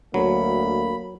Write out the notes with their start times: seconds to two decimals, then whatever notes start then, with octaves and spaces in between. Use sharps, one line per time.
0.14 D2 F#3 A#3 B5